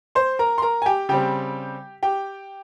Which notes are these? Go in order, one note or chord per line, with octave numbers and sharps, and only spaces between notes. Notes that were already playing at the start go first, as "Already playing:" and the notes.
C5 C6
A#4 A#5
C6
A#4 A#5
G#5
G4 G5
C#3 G3 C4 G4 G5
G4 G5